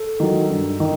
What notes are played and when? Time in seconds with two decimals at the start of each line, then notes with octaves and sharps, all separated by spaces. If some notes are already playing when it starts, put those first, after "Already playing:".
Already playing: A4
0.20 D#3 F#3
0.50 G2
0.80 D#3